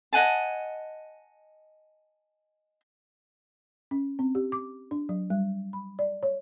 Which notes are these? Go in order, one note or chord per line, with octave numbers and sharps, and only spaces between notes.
D#5 F#5 G#5 A5
C#4
C4
G4
D6
D4
F#3
G3
B5
D5
C#5